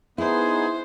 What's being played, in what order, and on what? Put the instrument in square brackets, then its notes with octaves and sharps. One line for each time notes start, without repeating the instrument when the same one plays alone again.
[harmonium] B3 D#4 [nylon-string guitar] E4 [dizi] G#4 [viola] C5